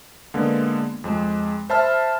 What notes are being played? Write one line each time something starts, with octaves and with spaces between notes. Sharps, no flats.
D3 G#3 A#3 B3
F2 G#3
C5 E5 A5 B5 F6